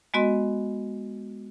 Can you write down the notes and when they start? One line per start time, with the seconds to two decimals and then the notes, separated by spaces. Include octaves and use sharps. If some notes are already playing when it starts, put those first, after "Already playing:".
0.14 G#3 B3 F#4 D#5 C6